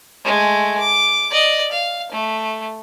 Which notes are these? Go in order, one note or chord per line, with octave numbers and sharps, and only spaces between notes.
G#3 A3
D6
D5 D#5
F5
A3